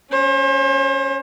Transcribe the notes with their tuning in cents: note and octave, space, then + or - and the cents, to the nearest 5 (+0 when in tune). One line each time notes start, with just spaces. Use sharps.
C#4 +0 C5 +40